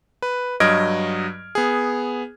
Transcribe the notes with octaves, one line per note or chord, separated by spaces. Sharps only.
B4
G2 F#3 D#5 F6 G#6 D7
B3 G#4